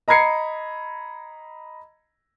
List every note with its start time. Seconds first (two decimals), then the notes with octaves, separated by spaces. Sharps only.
0.08 D#5 A#5 B5 G#6 C7 C#7